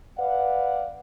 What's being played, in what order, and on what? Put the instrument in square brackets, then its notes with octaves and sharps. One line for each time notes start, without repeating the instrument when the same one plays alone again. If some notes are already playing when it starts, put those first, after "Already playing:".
[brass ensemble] B4 D5 F5 F#5